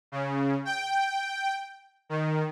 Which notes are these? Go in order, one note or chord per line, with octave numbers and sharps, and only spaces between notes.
C#3
G5
D#3